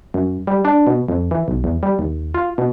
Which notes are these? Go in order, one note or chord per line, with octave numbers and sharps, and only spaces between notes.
F#2
G3
D4
B2
F2
E3
B1
E2
G3
D#2
F4
B2